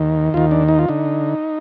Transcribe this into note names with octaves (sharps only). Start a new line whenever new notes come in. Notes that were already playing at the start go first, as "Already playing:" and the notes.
Already playing: D#2 D#3
D#2 D#3 F4
D4
D#4
F4
D3 D#4